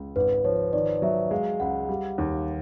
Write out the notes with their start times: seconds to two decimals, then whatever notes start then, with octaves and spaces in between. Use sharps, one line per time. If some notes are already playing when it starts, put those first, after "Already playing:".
Already playing: C#2
0.16 G#1 B4
0.44 F3 C#5
0.73 D#3 D5
1.02 F#3 E5
1.31 G#3 F5
1.60 C#2 F#5
1.89 G3
2.18 D#2